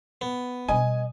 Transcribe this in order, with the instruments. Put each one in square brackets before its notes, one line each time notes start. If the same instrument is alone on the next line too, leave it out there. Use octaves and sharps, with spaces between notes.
[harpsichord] B3
[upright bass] B2 G3 [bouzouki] D#5 [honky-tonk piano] G#5